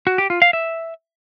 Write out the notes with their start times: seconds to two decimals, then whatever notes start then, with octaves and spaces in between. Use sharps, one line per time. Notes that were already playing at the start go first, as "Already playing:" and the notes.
0.07 F#4
0.18 G4
0.30 F4
0.42 F5
0.53 E5